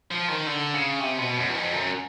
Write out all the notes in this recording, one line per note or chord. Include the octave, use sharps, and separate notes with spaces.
F3
D#3
D3
C#3
C3
B2
F#2
E2
F2
F#2